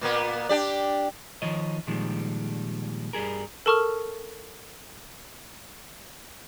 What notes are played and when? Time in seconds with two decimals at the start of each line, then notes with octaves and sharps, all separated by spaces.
0.01 A#2 A#3 B3
0.49 D4 G4 D5
1.42 D#3 F3 C#5 D#5
1.87 A#2 D#3 F3 G3 G#3
3.13 G2 G3 G#4 A#4
3.66 A4 A#4 A5 C#6 D#6 F6